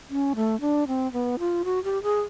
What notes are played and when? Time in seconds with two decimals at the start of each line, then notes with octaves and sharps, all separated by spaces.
0.10 C#4
0.36 A3
0.61 D4
0.88 C4
1.13 B3
1.39 F4
1.65 F#4
1.84 G4
2.03 G#4